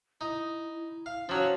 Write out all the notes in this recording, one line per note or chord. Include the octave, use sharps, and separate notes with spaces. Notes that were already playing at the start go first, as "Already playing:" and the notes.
D#4 E4
F5
F3 F#3 C#4